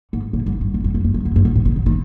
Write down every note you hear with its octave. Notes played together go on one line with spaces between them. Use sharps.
G#2
A#2
G#2
G2
F#2
F2
F2
G2
F2
F#2
G2
G#2
A2
C#3
D3
D#3